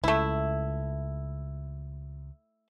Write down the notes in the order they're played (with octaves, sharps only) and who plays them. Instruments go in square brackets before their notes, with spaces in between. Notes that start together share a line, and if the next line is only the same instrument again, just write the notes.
[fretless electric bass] C#2 [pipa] A3 E4